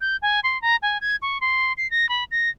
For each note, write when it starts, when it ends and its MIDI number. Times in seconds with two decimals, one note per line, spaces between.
0.01 0.16 91
0.22 0.40 80
0.43 0.60 84
0.62 0.76 82
0.82 0.98 80
1.01 1.16 92
1.22 1.38 85
1.41 1.73 84
1.77 1.90 96
1.91 2.09 94
2.09 2.24 83
2.31 2.50 94